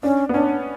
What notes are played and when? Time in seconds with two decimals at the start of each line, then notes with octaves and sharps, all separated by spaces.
0.03 C#4 D4
0.29 B3
0.34 C#4 D4